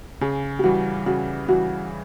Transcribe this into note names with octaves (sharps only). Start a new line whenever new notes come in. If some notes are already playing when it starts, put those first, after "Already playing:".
C#3 G#4
G4
E3 G3 F#4
C#3 F#4
E3 G3 F#4